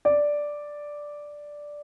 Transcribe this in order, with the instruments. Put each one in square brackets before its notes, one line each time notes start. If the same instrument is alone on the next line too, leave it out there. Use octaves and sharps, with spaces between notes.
[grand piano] D5